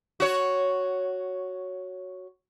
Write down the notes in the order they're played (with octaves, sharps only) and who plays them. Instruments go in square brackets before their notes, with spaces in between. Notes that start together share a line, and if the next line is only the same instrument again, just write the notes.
[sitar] F#4 C#5